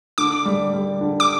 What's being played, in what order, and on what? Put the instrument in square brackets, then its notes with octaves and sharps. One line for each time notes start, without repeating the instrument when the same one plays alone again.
[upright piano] D3 [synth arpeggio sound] D6
[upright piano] G3
G3
D3
[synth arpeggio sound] D6